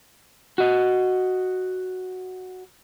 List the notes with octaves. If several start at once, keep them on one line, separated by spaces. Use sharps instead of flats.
F#4 D#5